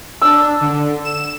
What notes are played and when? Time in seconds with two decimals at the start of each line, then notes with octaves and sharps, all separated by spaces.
0.22 D4 E6
0.61 D3
1.04 E7